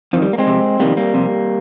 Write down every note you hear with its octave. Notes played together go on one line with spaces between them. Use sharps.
F2 D#3 F3
G3
A#3
G#3 C4
F2 C3
F2 C3 D#3 G3 A#3
G3 A#3
F2 C3